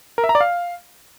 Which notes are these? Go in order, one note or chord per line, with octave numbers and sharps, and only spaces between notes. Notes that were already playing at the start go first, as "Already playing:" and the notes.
A#4
E5
A#5
D5
F5